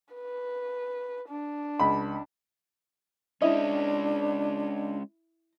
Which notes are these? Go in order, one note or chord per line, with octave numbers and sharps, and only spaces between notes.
B4
D4
C#2 B5
G#3 C#4 D4 E4 D#5